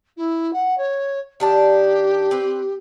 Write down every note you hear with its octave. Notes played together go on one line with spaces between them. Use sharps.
E4
F#5
C#5
D#3 D4 G4 A5
C4 B4